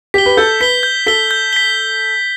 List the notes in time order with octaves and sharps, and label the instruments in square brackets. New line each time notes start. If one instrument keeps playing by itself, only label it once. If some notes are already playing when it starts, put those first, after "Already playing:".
[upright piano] G4 [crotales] B6 G7
[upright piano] B4
[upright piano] A4 [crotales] G6
[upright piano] B4 [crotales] B6 G7
[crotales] G6
[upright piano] A4 [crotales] B6 G7
[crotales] G6
B6 G7